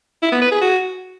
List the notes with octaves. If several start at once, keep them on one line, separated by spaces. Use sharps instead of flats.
E4
B3
B4
G#4
F#4